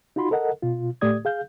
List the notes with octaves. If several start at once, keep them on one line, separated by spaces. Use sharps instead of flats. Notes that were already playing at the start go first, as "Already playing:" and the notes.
D#4 F4 F#4 B5 C6
A4 A#4 D#5 F#5
B2 F4
A2 A3 G4 D5 D#6 G#6
G#4 F5 G6